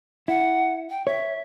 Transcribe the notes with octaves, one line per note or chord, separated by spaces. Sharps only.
E4 F#5
G5
C#5 E5